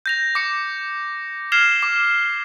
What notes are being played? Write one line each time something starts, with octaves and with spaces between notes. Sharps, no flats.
G6 A#6 F7
D6 C#7
F6 G#6 C7 E7 F7 G7
D6